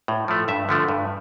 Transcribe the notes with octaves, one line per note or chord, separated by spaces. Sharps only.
A2
F3 A3
G2 E5
D3 F3 A3
G2